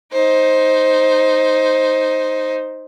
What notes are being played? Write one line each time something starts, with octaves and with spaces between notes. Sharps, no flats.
D#4 C5